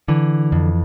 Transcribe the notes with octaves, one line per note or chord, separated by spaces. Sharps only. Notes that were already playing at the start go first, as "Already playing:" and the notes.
D3 E3
F2